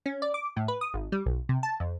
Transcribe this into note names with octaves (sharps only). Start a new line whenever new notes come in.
C#4
D5
D6
A2
B4
D#6
G#1
G3
B1
C3
A5
F2